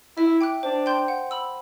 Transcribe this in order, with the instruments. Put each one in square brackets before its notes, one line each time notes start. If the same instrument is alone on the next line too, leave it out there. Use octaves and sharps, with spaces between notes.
[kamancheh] E4 [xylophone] E5
[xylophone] G5 D6 F#6
[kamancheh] D4 [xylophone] C5
[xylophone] G5 C6 G6
F#5
B5 E6